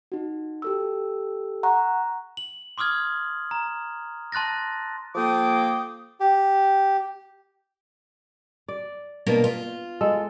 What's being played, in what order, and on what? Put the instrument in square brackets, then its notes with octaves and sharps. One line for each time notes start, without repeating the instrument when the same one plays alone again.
[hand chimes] D#4 F#4
G4 A4 E6
F#5 A#5 C#6 F#6
[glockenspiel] F#7
C6 D6 D#6 F6 G#6
A#5
A5 C6 F#6 A6 A#6
[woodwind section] F3 A#3 A4 G5 D6 D#6
[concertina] G4
[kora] D5
[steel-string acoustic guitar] B2 A#3 D4
F4
[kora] G#3 A4